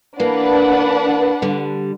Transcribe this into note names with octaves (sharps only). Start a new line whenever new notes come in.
E3 A#3 D4 B4 F#5
D3 G3